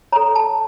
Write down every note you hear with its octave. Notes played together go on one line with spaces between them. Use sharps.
A4 C#5 A#5
A5